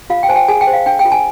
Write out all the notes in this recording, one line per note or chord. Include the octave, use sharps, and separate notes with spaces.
F4 F5
G5
C5 G#5
G5
G#4 G#5
G5
C5
F5
D4 G5
G5
F4
G#5